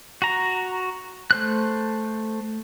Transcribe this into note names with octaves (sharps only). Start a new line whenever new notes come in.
F#4 A#5
A3 C5 F#6